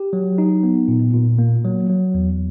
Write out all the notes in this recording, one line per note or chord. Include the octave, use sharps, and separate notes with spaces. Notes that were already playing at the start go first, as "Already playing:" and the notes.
Already playing: G4
F#3
D#4
B3
A#2
A#2
A#3
F#3
F#3
E2